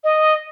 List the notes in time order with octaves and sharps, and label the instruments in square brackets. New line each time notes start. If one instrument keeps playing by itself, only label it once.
[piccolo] D#5